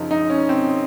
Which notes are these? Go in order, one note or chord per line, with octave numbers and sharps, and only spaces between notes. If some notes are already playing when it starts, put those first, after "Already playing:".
Already playing: F#2 C#3 F3 D#4
D#4
C#4
C4